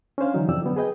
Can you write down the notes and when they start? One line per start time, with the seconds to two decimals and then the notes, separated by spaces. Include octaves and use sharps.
0.18 C#4 D4 C5 F5
0.34 D3 E3 F#3 D#4
0.48 F2 C3 F3 D5 G5 E6
0.62 D3 F#3 B3
0.76 G#4 B4 D#5 G5